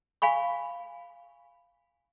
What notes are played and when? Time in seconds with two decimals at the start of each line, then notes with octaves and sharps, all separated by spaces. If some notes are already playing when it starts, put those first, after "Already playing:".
0.22 F5 G#5 B5 C#6